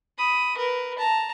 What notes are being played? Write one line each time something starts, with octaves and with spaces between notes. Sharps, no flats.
B5 D#6
A#4 B4
A5 A#5